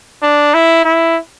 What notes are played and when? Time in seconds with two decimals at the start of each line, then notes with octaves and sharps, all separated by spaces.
0.23 D4
0.54 E4
0.85 E4